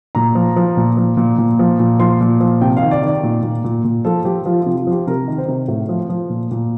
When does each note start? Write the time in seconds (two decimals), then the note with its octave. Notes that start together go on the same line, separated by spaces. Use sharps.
0.15 A#2 A#5
0.35 F3
0.56 F3
0.77 A#2
0.97 F3
1.17 A#2
1.38 A#2
1.59 F3
1.80 A#2
1.99 F3 C6
2.21 A#2
2.40 F3
2.61 C3 G5
2.77 F5
2.82 D#3
2.91 D5
3.02 D#3 D5
3.23 A#2
3.43 A#2
3.64 A#2
3.85 A#2
4.05 F3 A4
4.25 F3 G4
4.46 F3 F4
4.61 C3 F4
4.77 F4
4.87 F3 G4
5.07 C3 A#4
5.28 D#3
5.38 C5
5.48 C3
5.68 A2
5.89 F3
6.09 F3
6.30 A#2
6.51 A#2